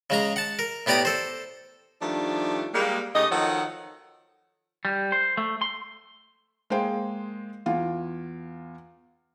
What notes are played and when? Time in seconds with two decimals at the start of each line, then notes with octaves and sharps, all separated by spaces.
0.10 C#3 G#3 A#5
0.36 F#5 A5
0.59 A#4
0.86 A2 B3 G4 D5 A#5 D#6
1.05 A4 C5
2.01 D#3 F3 G3 A3 D4
2.74 G3 G#3 A#3
3.15 C#3 A3 G4 D#5
3.31 D#3 F3 F#3 A4 C#5 F#5
4.85 G3
5.12 C5
5.37 A3
5.62 C6
6.70 G#3 A#3 G#4 C5 F5 G5
7.66 E2 F4 F5